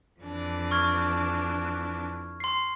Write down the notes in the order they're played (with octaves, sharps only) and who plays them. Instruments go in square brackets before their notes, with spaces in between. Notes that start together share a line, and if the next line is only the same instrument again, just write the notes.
[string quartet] F2 E3 D4
[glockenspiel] C#6 F6 G#6
C6 C7